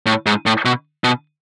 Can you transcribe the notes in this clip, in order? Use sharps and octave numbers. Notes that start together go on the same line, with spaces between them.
A2
G#2
A2
B2
B2